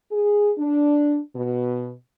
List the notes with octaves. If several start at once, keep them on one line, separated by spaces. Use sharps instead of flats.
G#4
D4
B2